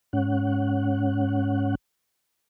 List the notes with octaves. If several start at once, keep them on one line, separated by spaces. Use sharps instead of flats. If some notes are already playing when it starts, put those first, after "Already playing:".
G#2 C#4 F#5